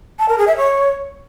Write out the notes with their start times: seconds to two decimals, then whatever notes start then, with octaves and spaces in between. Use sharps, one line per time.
0.19 A5
0.29 A#4
0.38 G#4
0.47 E5
0.57 C#5